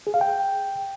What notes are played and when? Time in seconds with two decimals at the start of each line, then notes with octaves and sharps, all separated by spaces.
0.07 G#4
0.14 F5
0.21 G5